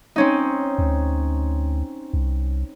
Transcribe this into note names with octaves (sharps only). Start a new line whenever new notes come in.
C4 C#4 D#4
D2
C2